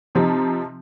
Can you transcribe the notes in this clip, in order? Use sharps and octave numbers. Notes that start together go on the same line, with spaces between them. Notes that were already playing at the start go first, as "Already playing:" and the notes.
C3 F3 C4 D#4